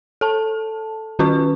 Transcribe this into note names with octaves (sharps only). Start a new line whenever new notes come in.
A4 A5
D#3 C#4 F#4 B4 C#6